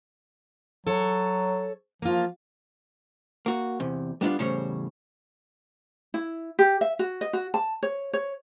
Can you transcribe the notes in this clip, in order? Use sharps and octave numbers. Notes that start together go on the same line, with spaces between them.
F#3 A4 C#5
F3 A#3 F4
A#3 F#4
E2 C3
G3 B3 D4 D#4 F4
E2 A2 C#3 G3 C5 C#5
E4
G4
E5
F#4
D#5
F#4
A5
C#5
C#5